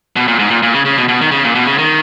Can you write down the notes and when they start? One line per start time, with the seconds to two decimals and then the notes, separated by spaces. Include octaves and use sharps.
0.16 B2
0.28 A#2
0.39 G#2
0.50 A#2
0.63 A#2
0.74 C#3
0.85 C#3
0.97 B2
1.08 B2
1.21 D#3
1.31 C#3
1.44 A#2
1.55 B2
1.67 C#3
1.78 D#3